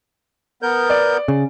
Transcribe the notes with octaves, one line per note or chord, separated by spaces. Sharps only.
B3 A#4 G6
D5
C#3